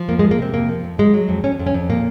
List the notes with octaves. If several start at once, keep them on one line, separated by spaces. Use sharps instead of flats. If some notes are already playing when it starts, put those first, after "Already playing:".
Already playing: F3
F2 A#3
G#3
F2
A#3
C3 C4
F2 A#3
F3
F2
F#3 G#3
F#3
F2
F2 C#4
F2
C#4
F2
A#2 A#3